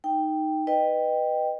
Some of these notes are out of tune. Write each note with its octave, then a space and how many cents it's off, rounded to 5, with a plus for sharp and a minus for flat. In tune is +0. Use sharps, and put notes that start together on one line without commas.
D#4 +0 G5 +0
B4 +0 D#5 -20 G5 +0